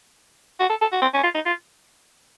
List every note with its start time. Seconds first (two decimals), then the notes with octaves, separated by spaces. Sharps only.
0.60 F#4
0.69 A4
0.81 A4
0.92 F#4
1.02 C4
1.13 C#4
1.23 F4
1.34 D#4
1.46 F4